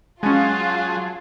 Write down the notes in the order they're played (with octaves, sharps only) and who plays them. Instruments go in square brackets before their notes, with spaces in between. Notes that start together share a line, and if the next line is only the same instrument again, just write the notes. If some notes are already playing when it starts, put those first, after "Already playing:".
[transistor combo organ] F#3 G#4 [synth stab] G#3 C#4 [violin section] F4 [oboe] A5